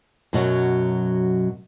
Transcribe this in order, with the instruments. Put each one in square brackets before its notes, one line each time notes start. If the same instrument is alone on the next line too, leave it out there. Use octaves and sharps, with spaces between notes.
[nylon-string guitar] F#2 B2 F#3